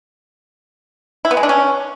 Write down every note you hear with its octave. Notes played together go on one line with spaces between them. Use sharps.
E4
B3
G#3
D4
C#4